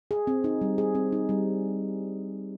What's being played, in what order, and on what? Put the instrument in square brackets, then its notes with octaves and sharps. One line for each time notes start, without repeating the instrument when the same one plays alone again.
[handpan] G#4
C4
D#4
G3
G#4
C4
D#4
G3